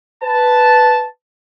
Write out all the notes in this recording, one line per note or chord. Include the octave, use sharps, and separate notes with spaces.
B4 A5